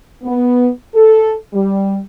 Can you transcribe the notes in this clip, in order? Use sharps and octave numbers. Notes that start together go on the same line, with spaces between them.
B3
A4
G3